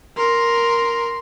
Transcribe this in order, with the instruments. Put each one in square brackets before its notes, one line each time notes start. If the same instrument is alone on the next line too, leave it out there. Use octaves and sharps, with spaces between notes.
[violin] A#4 [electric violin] C6